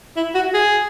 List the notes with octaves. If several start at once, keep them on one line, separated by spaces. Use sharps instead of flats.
E4
F#4
G#4